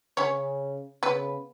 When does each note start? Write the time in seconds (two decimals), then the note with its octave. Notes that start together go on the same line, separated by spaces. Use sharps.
0.17 C#3 C#4 C#5
1.03 C#3 B3 B4